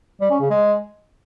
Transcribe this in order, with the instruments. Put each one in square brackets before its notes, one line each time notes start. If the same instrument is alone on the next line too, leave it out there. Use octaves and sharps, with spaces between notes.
[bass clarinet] G3
C#4
C#3
G#3